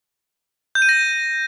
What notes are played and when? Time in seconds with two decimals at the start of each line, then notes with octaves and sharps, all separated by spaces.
0.75 G6
0.82 D#7
0.89 A#6